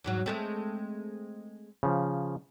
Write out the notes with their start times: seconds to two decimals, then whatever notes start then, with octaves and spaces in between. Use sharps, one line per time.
0.04 E2 G#2 F#3
0.26 G#3 A3 C4
1.83 C#3 F3